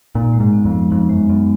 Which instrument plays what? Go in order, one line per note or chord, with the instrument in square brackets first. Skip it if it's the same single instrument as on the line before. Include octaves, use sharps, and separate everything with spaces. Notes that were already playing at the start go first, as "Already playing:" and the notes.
[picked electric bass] A#2 [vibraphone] D#4
[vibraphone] G#3
[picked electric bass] G#2
[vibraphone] B3
[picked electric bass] F2
[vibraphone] G#3
[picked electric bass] F2 [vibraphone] D#4
[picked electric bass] F#2 [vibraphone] G#3
[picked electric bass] F#2 [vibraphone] B3